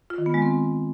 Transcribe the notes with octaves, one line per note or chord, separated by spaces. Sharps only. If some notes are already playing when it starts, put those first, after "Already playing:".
F4
D#3
B3
G#3
C4